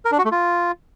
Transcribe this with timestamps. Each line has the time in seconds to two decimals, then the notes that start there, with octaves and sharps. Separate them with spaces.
0.05 A#4
0.12 D4
0.18 F#4
0.25 A3
0.32 F4